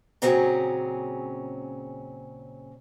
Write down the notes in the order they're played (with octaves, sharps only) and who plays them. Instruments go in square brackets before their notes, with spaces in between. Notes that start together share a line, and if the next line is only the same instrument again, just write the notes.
[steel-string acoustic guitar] A#2 C#3 F#3 C4 C#4 G#4